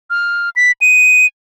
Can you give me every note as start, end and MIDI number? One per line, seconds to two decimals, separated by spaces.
0.10 0.50 89
0.56 0.72 95
0.81 1.26 99